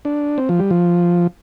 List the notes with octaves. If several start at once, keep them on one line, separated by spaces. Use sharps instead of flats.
D4
C4
F3
G3
F3